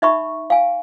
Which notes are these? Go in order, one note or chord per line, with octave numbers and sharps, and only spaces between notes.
D#4 E5 B5 C#6
F5 G#5